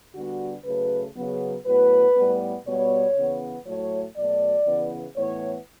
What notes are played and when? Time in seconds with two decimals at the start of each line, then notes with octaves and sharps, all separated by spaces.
0.15 D3 G3 B3 F#4
0.65 C#3 F#3 A3 B4
1.16 C#3 F#3 B3
1.65 A2 F#3 B3 B4
2.16 A2 G3 B3
2.66 B2 G3 B3 C#5
3.16 C#3 E3 B3
3.66 A2 F#3 A3 C#5
4.16 B2 F#3 A3 D5
4.66 C#3 E3 B3
5.16 A2 E3 B3 C#5